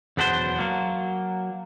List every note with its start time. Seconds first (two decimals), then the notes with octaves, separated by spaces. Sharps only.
0.17 B1 E2 B3 D4 F#4 C5
0.59 F#3 A#3